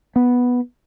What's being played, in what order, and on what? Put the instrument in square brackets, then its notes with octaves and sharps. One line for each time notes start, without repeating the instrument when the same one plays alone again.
[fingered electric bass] B3